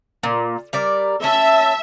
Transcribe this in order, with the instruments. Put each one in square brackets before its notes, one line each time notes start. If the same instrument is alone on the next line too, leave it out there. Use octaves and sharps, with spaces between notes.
[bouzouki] A#2
G3 A#4 D5
[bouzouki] C#4 [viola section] E5 [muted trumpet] A5